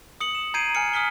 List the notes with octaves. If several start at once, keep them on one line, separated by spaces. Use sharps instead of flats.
D#6 C#7 F#7
E7
A#5 G6 G#6 C7 D7 D#7
G#5 F6 C#7
G#5 D#6 F6 B6 G7